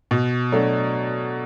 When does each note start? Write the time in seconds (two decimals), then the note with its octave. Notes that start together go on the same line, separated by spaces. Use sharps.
0.11 B2
0.52 F#3 A3 D4